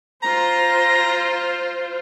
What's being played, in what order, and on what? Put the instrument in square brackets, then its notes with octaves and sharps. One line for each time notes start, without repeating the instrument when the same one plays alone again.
[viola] F4 C5 [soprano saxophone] A#5